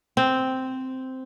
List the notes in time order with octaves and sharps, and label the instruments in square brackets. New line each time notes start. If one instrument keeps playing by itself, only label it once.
[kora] C4